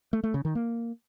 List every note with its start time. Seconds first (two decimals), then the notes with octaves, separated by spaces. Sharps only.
0.13 A3
0.24 A3
0.34 C#3
0.45 D#3
0.55 A#3